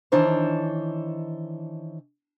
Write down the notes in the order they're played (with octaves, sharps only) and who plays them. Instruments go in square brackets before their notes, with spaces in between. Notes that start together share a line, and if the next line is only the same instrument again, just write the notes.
[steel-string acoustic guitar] D#3 E3 D4 C5 C#5 A5